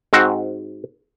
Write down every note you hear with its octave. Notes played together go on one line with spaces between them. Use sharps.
G#2 C4 F#4